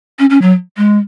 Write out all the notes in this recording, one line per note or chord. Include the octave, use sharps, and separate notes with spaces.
C#4
C#4
F#3
G#3